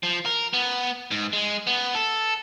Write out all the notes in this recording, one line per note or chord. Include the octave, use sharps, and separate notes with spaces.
F3
A#4
B3
G#2
G#3
B3
A4